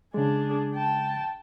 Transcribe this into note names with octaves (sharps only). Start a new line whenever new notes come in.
C#3 G#3 D4 G#4
G5 A5